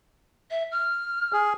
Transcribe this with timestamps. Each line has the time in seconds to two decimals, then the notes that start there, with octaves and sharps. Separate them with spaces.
0.51 E5
0.72 F6
1.33 G#4